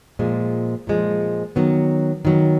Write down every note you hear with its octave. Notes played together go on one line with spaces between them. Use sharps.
A#2 F3 G#3
A#2 F3 G#3
D#3 F#3 B3
D#3 F#3 B3